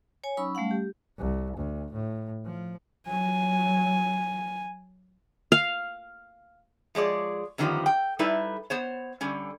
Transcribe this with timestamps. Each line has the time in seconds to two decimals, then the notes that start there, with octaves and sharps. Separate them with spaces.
0.24 C#5 G#5
0.37 F#3 C#4 D#4 B5 C#6 E6
0.55 G3 A3 C#4 F5 F#5
0.71 G4
1.18 C2
1.56 D2
1.93 A2
2.45 F3
3.08 F#3 G#5
5.52 F5
6.95 F3 G#3 C#5 D5
7.58 F#2 D3 D#3 F3 G3 B3
7.86 G5
8.19 G3 D#4 E4 A4 B4
8.70 B3 C5 C#5
9.21 D3 G3 C#4